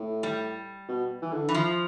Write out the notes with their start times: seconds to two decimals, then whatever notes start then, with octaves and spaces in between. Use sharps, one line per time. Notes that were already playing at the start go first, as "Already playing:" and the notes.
Already playing: A2
0.23 G3
0.89 B2
1.22 E3
1.33 D3
1.49 E3
1.55 F3